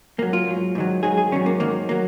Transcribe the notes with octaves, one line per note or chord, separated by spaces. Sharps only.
G#2 F#3 A#3
F4
G#2 F#3
G#2 D#3 F#3
G#2 D#3 F#3 G#4
G#4
G#2 D#3 F#3 C#4
A#3
G#2 D#3 F#3 A#3
F#3 A#3